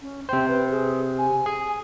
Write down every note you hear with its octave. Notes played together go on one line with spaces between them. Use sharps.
C#4
C3 C5 G5
B4
G#4
G#5
G#4